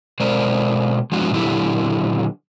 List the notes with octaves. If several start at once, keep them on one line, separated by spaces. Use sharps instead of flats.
B2 G#3 A#4 C5 D5
F3 G#3 D4 F#4
A#2 D3 F#3 E4 G4